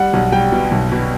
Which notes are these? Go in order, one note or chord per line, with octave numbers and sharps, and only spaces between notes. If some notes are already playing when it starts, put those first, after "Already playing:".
Already playing: G3 F#5
B1
G3 G5
B2
B1
B2